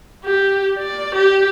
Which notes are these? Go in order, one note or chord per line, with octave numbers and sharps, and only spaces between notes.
G4
D5
G4